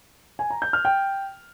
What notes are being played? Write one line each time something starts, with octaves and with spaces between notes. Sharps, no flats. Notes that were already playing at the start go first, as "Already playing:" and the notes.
G#5
A#5
G6
F6
G5